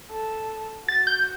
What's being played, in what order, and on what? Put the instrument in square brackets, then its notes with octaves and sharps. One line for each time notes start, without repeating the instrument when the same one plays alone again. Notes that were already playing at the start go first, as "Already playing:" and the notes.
[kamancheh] A4
[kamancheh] F#4 [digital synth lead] A6
[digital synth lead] G6